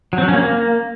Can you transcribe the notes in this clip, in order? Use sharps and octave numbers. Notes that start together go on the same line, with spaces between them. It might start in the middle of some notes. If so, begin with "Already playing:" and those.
F#3
C4
F#3
C#4
A#3